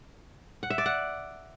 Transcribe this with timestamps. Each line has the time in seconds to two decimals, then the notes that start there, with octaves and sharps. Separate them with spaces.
0.63 F#5
0.70 E5
0.78 D5
0.86 F#5